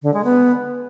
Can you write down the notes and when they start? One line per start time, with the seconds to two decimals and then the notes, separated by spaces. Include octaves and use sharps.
0.03 D3
0.14 G#3
0.24 B3